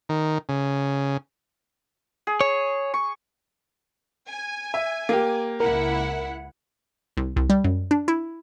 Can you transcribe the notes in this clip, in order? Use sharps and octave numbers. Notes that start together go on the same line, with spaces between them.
D#3
C#3
G#4
C#5
C#6
G#5
E5
A#3 G4
C#2 E4 A#4 F#5
C2
C2
G3
F#2
D4
E4